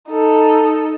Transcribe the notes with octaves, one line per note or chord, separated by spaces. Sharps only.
D#4 A4